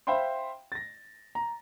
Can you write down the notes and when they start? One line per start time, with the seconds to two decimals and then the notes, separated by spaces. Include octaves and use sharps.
0.07 C5 E5 F5 G5 B5 C6
0.72 A6 A#6
1.35 A#5